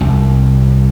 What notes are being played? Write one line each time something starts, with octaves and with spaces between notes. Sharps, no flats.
C2